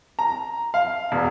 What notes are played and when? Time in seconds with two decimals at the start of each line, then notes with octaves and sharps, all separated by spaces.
0.19 A#5
0.74 F5
1.12 E1